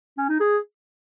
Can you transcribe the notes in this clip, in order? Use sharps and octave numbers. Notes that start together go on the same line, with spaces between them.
C#4
D#4
G#4